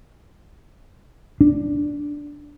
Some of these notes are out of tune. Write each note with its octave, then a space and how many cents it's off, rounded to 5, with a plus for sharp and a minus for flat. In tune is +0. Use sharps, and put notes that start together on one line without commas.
D4 -5